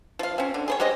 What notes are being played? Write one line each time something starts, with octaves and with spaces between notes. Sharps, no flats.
F3 F5
C4 C#4
D3
G#4 C5 C#5
G#3 G4 C5 D#5